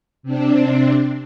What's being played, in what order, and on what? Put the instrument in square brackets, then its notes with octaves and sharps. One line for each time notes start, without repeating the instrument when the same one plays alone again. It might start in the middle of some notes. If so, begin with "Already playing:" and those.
[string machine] C3 C4 D4